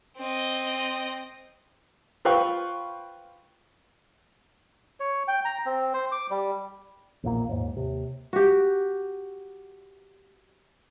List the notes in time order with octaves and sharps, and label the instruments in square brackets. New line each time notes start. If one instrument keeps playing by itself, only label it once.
[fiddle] C4 D#5
[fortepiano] F4 B4 C5 F5 G5 C#6
[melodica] C#5
G5
A#5
C4
C5
D6
G3
[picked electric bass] A#1 E2 A#2 A#3
D#2 G#2
D#2 C3
[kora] F#4 G4